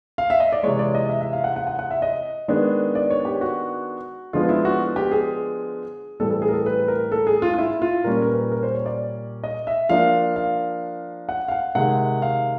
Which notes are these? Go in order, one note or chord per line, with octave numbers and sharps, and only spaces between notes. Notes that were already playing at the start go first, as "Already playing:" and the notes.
F5
E5
D#5
D5
C3 E3 G#3 C#5
D5
D#5
E5
E5
F5
F#5
F#5
F#5
F#5
E5
D#5
D#3 G#3 B3 D4
D5
C#5
G4
F#4
D3 F3 G#3 B3 D4 F4
E4
F#4
G4
G#4
A2 E3 G3 C4 A4
A4
G#4
A#4
A4
B4
A#4
A4
G#4
F4
F4
E4
F4
A#2 G3 A#3 C#4 A#4
A#4
B4
A#4
C5
C#5
D5
D#5
E5
F3 A#3 D4 F5
F5
F#5
F5
F#5
C3 D#3 G#3 F#5
F5